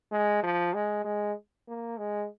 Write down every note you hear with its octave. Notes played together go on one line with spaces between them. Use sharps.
G#3
F3
G#3
G#3
A#3
G#3